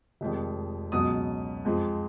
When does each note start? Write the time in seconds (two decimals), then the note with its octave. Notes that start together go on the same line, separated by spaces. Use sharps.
0.21 F1 F2 D#3 G#3
0.92 C#2 B2 F#3 D#6
1.65 F2 F3 G#3